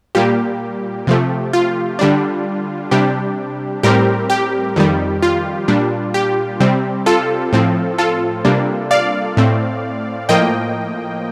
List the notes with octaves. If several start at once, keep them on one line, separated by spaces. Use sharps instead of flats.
A#2 G3 A#3 G4
C3 F3 A3
F4
D3 G3 D4
C3 G3 D4 G4
A2 G3 C4 G4 A#4
G4
F2 D#3 G3
F4
A#2 G3 D4
G4
C3 G3 C4
F4 A4
A2 F3 C4
F4 A4
C3 G3 A#3 D4
D5 F5
A2 A3 C4
A2 F3 A#3 D#5 G5